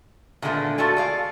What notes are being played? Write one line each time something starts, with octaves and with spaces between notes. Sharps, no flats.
A#2 D3 D#3 G#3 A3 B3
A3 F4 F#4 A4 D5 G#5
G#4 D5 F5